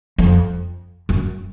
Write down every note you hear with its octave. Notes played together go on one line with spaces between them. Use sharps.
F2
F#2